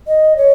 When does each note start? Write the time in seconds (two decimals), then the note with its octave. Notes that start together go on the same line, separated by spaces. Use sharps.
0.07 D#5
0.37 C#5